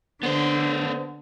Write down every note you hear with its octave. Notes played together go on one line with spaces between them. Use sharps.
D3 B3 C5